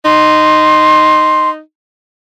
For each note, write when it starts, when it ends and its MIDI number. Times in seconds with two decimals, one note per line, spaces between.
0.05 1.60 63
0.05 1.49 84